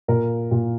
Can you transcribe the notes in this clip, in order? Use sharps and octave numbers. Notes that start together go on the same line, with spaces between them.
A#2 A#4
A#2